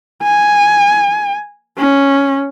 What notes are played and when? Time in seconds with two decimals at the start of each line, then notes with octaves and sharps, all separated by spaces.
0.23 G#5
1.78 C#4